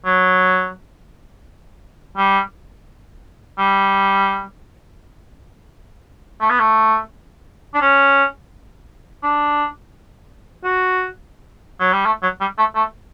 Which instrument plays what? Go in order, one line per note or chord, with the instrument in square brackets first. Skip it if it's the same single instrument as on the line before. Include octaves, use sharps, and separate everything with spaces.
[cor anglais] F#3
G3
G3
A3
B3
A3
D4
C#4
D4
F#4
F#3
G3
A3
F#3
G3
A3
A3